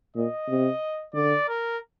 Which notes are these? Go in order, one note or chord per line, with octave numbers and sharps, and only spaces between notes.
A#2 D#5
C3
D3 D5
A#4